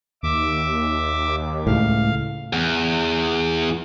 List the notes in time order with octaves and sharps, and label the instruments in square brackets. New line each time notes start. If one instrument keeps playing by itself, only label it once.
[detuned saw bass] D#2 [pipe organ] E5 D6
[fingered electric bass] C#2 A2 [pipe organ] F5
[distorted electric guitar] E2